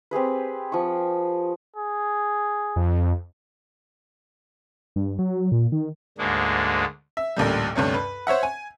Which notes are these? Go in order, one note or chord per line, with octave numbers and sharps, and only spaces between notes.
C4 G4 G#4 B4
F3 C#6
G#4
F2
G2
F#3
A#2
D#3
D2 G#2 G#3 A#3 D4
E5
A1 D2 A#2 G3
D2 G2 C3 C#4
B4
C5 C#5 E5 F#5
G#5